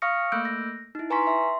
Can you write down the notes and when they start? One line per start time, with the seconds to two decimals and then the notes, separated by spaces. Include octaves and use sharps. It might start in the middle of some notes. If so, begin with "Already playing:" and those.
0.02 F5 C#6 D#6 F6 A#6 C#7
0.32 A3 A#3 E6 F#6 G6 D7
0.45 A#6
0.95 D#4 E4
1.10 B4 G#5 A#5 C6 C#6 B6
1.27 E5 C6